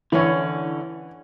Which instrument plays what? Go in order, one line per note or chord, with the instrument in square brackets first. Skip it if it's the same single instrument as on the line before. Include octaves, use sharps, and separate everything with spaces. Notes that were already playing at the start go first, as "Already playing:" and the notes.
[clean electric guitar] D3 C#4 [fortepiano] E3 [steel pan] E4 C#5